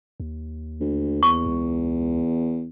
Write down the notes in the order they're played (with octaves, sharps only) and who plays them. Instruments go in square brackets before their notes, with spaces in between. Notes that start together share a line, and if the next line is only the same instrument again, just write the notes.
[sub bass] D#2
[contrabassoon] D2
[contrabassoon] E2 [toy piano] C#6
[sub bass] C#2